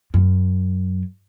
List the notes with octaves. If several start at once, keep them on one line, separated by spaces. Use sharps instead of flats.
F#2